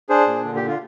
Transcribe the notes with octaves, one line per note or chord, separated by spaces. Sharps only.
D4 G#4 C5
A#2
D3
G4
D3
F4